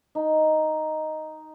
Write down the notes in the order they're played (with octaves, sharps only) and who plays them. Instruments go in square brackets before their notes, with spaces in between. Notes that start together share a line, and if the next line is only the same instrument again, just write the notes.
[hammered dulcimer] D#4